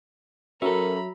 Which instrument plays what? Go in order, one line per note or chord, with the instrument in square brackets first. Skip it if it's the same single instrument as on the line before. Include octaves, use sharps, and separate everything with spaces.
[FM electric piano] F#3 E5 [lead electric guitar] C#4 A4 [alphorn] A#4 [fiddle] A#5 B5